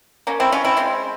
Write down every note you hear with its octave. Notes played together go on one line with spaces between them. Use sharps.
A#3 C#4
C4 E4
C#4 F4
C4 E4
G#3 C4